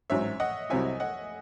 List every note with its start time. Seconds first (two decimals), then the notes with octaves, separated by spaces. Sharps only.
0.10 A1 G#2 F#3 C4 C#5 E5
0.40 D#5 F#5
0.70 C2 C3 F#3 C4 E4 E5 G#5
1.00 D#5 F#5